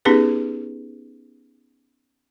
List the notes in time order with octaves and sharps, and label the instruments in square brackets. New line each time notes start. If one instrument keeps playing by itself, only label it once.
[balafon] B3 C#4 D#4 G4 G#4 B4